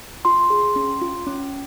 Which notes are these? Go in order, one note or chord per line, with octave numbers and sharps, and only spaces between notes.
F4 C6
G#4
C#4
F4
C#4